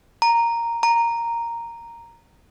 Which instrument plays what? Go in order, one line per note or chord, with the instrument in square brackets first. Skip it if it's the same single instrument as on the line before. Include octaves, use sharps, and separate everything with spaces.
[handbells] A#5
A#5